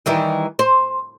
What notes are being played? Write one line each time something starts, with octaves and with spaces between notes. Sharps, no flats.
D#3 E3 G3
C5